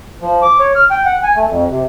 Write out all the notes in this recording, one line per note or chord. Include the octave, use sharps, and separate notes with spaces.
F3
D6
C#5
F6
G5
F#5
G#5
A3
F2
C3